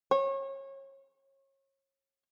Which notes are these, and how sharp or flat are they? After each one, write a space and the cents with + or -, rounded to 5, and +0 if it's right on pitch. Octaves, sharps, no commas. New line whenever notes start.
C#5 -30